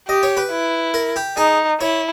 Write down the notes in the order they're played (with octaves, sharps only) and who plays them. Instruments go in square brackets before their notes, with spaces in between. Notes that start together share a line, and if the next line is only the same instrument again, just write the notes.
[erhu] G4 [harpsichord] D#5
[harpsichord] C#5
B4
[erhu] E4
[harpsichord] A#4
G4
[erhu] D#4 [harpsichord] G#4
[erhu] E4 [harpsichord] C#5